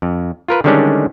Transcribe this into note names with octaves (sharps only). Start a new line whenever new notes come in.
F2
F4 A#4 B4
D3 D#3 G3 G#3 C#4 D4